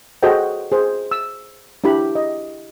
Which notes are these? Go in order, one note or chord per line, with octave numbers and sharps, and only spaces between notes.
F#4 G#4 A4 C5 D#5 G5
G#4 C5
E6
D4 E4 G4 B5
D#5